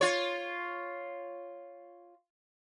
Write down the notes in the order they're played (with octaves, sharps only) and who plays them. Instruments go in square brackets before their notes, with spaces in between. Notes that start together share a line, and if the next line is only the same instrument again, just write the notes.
[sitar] F4 C#5